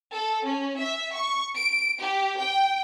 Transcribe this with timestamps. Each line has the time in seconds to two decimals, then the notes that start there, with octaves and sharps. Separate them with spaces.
0.13 A4
0.45 C#4
0.79 E5
1.15 C#6
1.56 D7
2.00 G4
2.38 G5